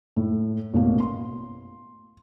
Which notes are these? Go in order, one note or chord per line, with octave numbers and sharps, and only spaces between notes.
A2
A1 B2 A#3
C6